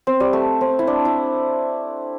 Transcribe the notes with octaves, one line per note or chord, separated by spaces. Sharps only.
C4
G3
A3
C4
E4
D4
E4